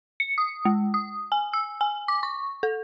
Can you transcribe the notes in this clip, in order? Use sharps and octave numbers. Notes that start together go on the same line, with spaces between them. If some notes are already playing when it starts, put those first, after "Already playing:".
C#7
D#6
G#3
D#6
G#5
E6
G#5
D6
C#6
A4